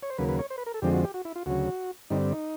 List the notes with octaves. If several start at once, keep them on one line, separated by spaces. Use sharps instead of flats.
C#5
C5
D#2 C#3 F#3 A#3 B4
B4
C#5
C5
B4
A#4
A4
F2 D3 F3 G#3 C4 G4
F#4
G4
F#4
E4
F4
D2 C#3 F#3 F#4
G2 D3 G3 C4 D#4
D#4